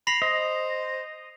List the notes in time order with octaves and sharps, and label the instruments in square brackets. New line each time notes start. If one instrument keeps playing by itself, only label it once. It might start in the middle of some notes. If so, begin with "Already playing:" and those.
[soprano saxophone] B5 [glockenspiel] A#6 C7 F7
[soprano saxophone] C5 [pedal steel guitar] D#5